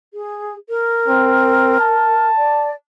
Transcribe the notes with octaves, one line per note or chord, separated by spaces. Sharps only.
G#4
A#4
C4
A5
D5